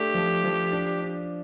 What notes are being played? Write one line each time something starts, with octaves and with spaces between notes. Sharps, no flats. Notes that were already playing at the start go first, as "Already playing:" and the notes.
Already playing: A3 D4 G4
F3
F3
D4
D4